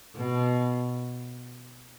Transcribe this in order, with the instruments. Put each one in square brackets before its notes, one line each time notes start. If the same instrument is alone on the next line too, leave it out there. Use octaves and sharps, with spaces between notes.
[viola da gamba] B2